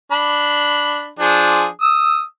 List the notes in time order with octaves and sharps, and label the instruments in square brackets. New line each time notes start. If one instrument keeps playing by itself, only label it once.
[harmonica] D4 B5
F3 D4 G#4
D#6 E6